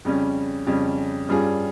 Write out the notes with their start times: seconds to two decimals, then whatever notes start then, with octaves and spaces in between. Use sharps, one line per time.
0.05 F2 C#3 G3 C#4
0.66 F2 C#3 G3 C#4
1.29 G2 G3 C#4 F4 G#4